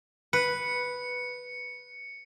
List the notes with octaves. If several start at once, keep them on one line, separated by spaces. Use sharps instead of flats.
B4 C#7